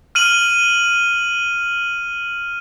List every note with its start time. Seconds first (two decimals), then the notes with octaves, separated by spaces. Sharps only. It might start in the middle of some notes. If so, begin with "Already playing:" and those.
0.15 F6 D#7 F#7